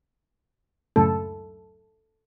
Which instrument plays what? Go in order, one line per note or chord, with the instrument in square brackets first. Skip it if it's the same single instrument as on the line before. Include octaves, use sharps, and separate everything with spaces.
[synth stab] C#2 F#2 A2 [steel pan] A4